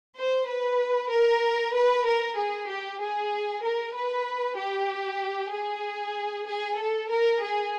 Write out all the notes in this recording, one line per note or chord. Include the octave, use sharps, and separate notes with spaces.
C5
B4
A#4
B4
A#4
G#4
G4
G#4
A#4
B4
G4
G#4
G#4
A4
A#4
G#4